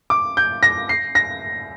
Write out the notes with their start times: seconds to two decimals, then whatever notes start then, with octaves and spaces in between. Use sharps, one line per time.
0.10 D6
0.37 G6
0.63 A#6
0.89 C7
1.15 A#6